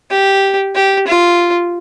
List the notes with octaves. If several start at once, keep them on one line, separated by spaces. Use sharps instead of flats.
G4
G4
F4